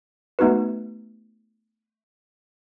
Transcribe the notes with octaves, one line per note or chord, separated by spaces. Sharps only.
A3 B3 D#4 F#4 B4